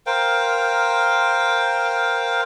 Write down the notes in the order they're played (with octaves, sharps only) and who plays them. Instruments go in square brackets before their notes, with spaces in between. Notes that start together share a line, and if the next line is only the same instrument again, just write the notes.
[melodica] A#4 C5 F5 G5